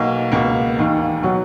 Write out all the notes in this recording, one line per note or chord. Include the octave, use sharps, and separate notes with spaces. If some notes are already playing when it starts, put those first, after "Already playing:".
Already playing: B1 B2 A#3
C#2 B2 A#3
E1 D#2 D#3
B2 F#3